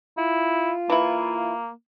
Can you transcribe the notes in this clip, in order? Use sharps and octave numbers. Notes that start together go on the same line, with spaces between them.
E4 F4
E3 A#3 E4